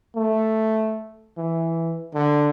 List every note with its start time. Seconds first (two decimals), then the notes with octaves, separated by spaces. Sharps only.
0.16 A3
1.38 E3
2.15 D3